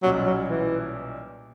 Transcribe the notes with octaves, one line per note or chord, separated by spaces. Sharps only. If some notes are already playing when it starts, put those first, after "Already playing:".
B1 A#2 F#3 G3 C#4
F#3
E3